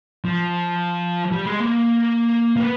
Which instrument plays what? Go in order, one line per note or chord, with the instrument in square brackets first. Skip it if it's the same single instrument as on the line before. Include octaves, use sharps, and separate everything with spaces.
[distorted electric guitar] F3
G3
G#3
A#3
A#3
B3